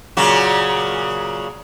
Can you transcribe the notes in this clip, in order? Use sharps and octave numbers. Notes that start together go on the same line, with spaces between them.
A#2 C#3 F#3